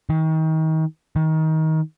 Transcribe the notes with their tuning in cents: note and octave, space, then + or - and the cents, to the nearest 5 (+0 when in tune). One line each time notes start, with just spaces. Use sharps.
D#3 +35
D#3 +25